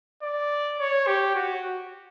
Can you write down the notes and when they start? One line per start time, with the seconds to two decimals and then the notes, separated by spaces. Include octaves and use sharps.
0.23 D5
0.79 C#5
1.07 G4
1.35 F#4